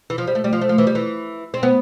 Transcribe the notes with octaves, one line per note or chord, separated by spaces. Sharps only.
E3
F3
G3
A3
G3
F3
A3
F3
E3
G3
E3
C4
B3